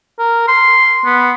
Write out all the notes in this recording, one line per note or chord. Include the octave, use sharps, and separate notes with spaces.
A#4
C6
B3